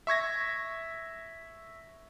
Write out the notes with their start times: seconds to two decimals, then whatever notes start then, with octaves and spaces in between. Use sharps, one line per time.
0.07 E5 C#6 G#6 A#6